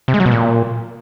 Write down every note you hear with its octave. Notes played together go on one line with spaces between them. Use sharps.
C3
G#3
F#3
B2
A#2